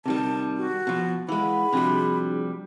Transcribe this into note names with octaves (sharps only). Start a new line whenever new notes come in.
C3 D#3 G3 A5
F#4
B2 F3
E3 G#3 F5 F#5 B5
C3 F3 G3 D4 F#4 G#4